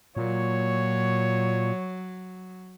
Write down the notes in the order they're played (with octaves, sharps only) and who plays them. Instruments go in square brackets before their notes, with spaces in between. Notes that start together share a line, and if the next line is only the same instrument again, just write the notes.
[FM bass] A#2 [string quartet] F#3 [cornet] C#5